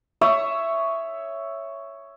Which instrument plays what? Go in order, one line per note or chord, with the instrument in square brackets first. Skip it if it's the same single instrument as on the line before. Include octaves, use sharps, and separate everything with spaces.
[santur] C#5 E5 C#6 D#6